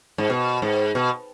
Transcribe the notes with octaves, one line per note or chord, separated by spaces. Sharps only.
G#2
B2
G#2
B2